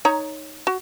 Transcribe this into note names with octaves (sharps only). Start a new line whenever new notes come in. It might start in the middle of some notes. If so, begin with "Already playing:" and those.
D#4 C#5 A#5
F#4